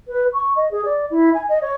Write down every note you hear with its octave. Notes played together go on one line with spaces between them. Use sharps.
B4
C#6
D#5
G#4
D5
E4
G#5
D#5
C#5